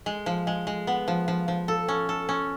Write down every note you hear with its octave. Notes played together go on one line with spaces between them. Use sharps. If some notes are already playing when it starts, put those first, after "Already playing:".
G#3
F3
G#3
G#3
B3
F3
F3
F3
A4
C#4
A4
C#4